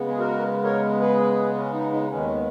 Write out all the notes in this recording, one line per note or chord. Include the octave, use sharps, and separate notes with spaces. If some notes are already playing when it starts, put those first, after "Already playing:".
Already playing: C#3 G#3 B3
G#4
F#4 A#4
A#4 C#5
G#4 B4
C#4
D#4
D#4
D#4
D#2 D#3 G#3 B3 C#4